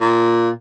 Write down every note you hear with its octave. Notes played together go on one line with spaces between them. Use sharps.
A#2